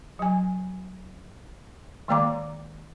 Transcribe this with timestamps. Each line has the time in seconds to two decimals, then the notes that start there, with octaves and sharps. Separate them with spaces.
0.19 F#3 G#5
2.08 D#3 G#3 A#3 D5 A#5 D6